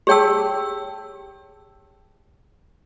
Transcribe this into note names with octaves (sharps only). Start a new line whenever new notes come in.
G4 G#4 C#5 G5 A5 E6